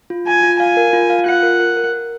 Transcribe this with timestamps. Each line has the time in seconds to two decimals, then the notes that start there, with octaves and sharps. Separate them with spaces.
0.10 F4
0.27 F4 G#5
0.43 F4
0.59 F5 G#5
0.77 A#4
0.93 F4
1.10 F5
1.26 F4 F#5
1.43 A#4
1.60 A#4
1.77 A#4
1.93 A#4